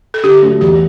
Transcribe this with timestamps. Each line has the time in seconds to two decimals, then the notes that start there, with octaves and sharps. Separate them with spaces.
0.14 A4
0.23 D3 G4
0.43 F#3 A3 D4
0.61 E2 G4